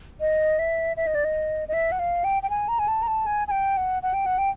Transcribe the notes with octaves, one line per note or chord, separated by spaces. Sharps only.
D#5
E5
E5
D#5
D5
D#5
D#5
E5
F#5
F5
G5
G5
G#5
A#5
G#5
A5
A#5
A5
G#5
G#5
G5
F#5
F#5
G5
F#5
G5